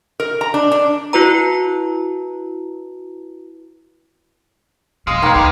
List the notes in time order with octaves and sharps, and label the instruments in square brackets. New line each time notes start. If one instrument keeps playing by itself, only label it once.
[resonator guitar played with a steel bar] A#4
A#5
D4
D4
[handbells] E4 F#4 B4 A#5
[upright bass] F2 B2 [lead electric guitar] G#3 [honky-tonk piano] F5 D#6
[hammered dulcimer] D#3 A#3 [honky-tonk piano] B4 F5
[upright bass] D2 [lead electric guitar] D3